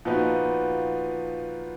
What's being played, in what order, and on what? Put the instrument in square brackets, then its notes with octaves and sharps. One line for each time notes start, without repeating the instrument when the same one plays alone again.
[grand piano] A#2 F3 B3 D#4 F#4